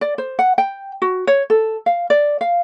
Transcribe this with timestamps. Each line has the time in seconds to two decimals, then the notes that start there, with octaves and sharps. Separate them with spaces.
0.01 D5
0.18 C5
0.39 F#5
0.58 G5
1.02 F#4
1.27 C#5
1.50 A4
1.86 F5
2.10 D5
2.41 F5